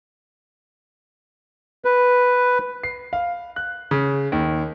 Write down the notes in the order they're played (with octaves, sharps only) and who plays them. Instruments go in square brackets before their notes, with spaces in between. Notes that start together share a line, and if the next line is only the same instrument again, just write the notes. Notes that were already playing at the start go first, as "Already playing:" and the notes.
[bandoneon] B4
[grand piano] C7
F5
F#6
C#3
D#2